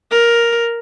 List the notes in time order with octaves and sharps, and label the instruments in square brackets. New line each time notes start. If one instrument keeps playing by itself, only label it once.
[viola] A#4